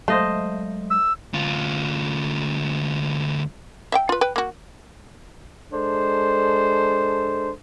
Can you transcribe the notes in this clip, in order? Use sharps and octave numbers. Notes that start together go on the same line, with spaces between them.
F#3 G#3 A3 C5 D#5 F5
E6
D2 F4
E5 F5 G5
F4 B4
B4 G5
A#3 F#4
G#3 D4 A4 C5